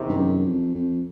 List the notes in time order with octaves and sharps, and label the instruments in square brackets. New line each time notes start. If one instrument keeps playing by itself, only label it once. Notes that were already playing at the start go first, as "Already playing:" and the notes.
Already playing: [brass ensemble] E2 C3 D#3
[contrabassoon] G2
F#2
F2
F2